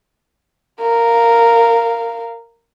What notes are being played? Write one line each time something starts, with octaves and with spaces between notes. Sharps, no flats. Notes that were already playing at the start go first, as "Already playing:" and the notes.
A#4 F5